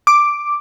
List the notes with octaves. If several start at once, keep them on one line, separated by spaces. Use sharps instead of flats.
D6